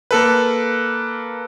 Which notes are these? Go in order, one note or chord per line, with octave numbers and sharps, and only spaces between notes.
A#3 A4 B4